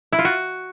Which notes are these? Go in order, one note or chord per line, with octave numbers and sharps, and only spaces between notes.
E4
F4
F#4